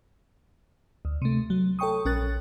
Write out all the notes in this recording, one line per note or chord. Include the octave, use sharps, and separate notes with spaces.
D2
C3 A3
F#3
A4 C#5 G5 C#6 D#6
A#1 C#4 A#4 F#6 A6